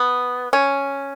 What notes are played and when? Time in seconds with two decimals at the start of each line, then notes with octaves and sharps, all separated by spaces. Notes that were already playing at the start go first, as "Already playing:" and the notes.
Already playing: B3
0.53 C#4